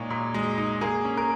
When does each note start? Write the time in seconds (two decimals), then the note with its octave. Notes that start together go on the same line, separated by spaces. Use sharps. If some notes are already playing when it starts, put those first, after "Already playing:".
Already playing: A#2 G#3 D#4 C#5
0.10 A#2
0.34 G#3
0.58 D#4
0.81 A#3 G#4
1.05 C#4
1.17 A#4